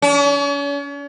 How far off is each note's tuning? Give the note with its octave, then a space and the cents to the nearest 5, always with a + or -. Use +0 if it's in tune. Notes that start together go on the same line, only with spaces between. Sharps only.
C#4 +40